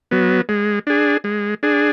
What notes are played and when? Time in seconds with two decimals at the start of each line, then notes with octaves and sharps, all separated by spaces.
0.11 F#3 B3
0.49 G#3
0.87 D4 G#4
1.24 G#3
1.63 D4 G#4